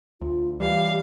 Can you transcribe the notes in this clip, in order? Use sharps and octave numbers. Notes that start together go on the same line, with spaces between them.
D2 F4
E3 G3 G4 F5